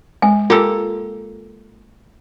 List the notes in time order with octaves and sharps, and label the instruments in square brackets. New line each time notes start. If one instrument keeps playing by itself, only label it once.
[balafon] G#3 [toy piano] G#5
[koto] A#3 G4 A4 [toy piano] F4 E6